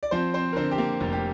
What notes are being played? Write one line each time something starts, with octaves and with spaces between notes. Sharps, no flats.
D5
F3 C4 C5
C4 C5
A#4
D3 C4 C5
G4
A#3 A#4
F1
G4